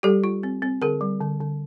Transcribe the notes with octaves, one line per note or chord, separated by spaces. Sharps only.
G3 G4 A4
F4
C4
C4
D3 G#4 A#4
G3
D3
D3